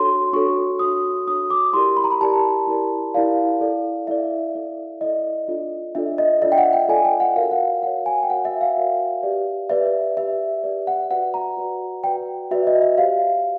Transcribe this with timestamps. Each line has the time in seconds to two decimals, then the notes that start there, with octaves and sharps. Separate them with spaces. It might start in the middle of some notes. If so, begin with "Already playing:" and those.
Already playing: D4 F#4 A4 C#5 C6
0.33 D4 F#4 A4 C#5 C#6
0.79 D4 F#4 A4 C#5 D#6
1.27 D4 F#4 A4 C#5 D#6
1.50 D6
1.73 E4 G4 A#4 D5 C6
1.97 B5
2.04 A#5
2.11 B5
2.20 E4 G4 A#4 D5 A5
2.67 E4 G4 A#4 D5
3.14 E4 G4 A#4 D5 F5
3.61 E4 A4 D5
4.07 E4 A4 D5 E5
4.55 E4 A4 D5
5.01 E4 A4 D5 D#5
5.48 D4 F4 A4 D5
5.95 D4 F4 A4 D5 E5
6.18 D#5
6.42 D4 F4 A4 D5 E5
6.52 G5
6.58 F#5
6.73 G5
6.88 D4 F4 A4 D5 G#5
7.05 G5
7.20 F#5
7.36 F#4 A#4 C#5 F5
7.51 F#5
7.83 F#4 A#4 C#5 F#5
8.06 G#5
8.23 G5
8.29 F#4 A#4 C#5 F#5
8.45 E5
8.61 F5
8.77 F#4 A#4 C#5
9.23 G4 B4 D5
9.70 G4 B4 D5 E5
10.17 G4 B4 D5 E5
10.64 G4 B4 D5
10.87 F#5
11.11 F#4 B4 D5 F#5
11.34 A#5
11.57 F#4 B4 D5
12.04 F#4 B4 D5 G5
12.51 F#4 B4 D5 E5
12.67 D#5
12.82 E5
12.97 G4 C5 F5